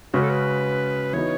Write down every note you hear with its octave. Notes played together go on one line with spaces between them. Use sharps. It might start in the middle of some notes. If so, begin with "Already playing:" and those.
C#3 G#3 C#4 F#4 B4
A4
B4
E3 B3 D#4 F#4 C#5